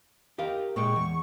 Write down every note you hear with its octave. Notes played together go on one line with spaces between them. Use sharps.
G4 A#4 F5
A#2 G#3 G5 C#6
E2